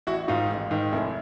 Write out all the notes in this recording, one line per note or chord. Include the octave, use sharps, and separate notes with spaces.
A1 E4 F#4
G#2 D#3 D#4 F4
A1
G#2 D#3
F1 E4